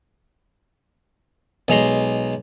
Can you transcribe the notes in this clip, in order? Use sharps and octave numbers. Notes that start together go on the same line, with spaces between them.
B1 G#3 A#5 C6